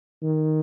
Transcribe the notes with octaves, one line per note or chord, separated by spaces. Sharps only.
D#3